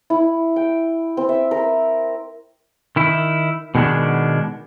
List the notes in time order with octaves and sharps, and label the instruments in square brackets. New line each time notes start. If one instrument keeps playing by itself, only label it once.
[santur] E4
G5
C4
E5
A#4
[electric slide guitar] D#3 E4
B2 D#3 G#3 B3 D4